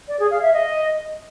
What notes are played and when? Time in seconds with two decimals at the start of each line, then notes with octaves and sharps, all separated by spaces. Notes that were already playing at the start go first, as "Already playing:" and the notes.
0.08 D5
0.19 G#4
0.31 F5
0.42 E5
0.53 D#5